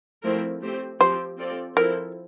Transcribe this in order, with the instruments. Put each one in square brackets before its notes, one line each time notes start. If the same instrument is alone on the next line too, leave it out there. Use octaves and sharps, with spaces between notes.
[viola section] F3 A3 C4 E4 A#4
A3 C4 G4 C5
[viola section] F3 C4 G4 [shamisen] C5
[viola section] C4 F4 A4 D5
[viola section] F3 C4 E4 A4 [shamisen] A#4